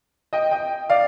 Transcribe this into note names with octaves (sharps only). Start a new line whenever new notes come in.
D#5 G5
D#5 G5
D5 F5